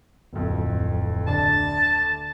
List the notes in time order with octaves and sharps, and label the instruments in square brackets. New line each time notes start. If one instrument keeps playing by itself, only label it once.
[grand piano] D1 F2
[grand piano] D2 D4 [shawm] A5